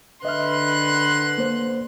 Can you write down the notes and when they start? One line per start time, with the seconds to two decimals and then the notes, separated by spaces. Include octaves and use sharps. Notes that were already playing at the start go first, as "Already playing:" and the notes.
0.25 D3 B4 D#5 E5 C6 F6 F#6
1.38 A#3 C5